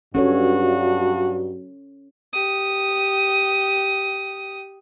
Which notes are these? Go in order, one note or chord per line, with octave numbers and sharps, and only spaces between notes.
G2 F#3 C#4 F#4 A4 C#5
G4 D#6